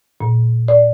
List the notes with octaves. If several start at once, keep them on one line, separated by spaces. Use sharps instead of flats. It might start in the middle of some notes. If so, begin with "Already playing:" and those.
A#2
D5